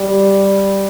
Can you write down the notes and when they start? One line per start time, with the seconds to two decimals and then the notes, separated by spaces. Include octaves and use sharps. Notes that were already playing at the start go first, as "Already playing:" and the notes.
Already playing: G3